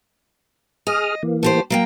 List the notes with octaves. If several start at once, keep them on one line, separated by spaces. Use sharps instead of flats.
G#4 D#5 D#6 F6
E3 A#3
A3 G4 C5
F#3 A#3 G5